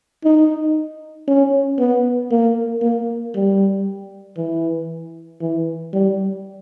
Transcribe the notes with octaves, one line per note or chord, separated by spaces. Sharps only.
D#4
C#4
B3
A#3
A#3
G3
E3
E3
G3